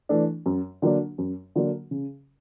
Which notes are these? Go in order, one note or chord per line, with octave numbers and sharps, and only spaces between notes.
E3 A3 D4
F#2
D3 F#3 A#3 D4
F#2
D3 F#3 A#3 D4
C#3